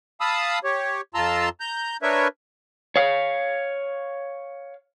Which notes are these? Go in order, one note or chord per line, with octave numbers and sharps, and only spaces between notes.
F5 A5 B5 D#6 E6
G4 C#5
F2 F4 A5 A#5 C6 E6
A#5 G6
D4 A#4 B4 C#5 E5
C#5 F5